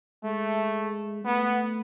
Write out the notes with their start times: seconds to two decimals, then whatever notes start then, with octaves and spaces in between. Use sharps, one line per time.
0.24 G#3 A3
1.25 A3 B3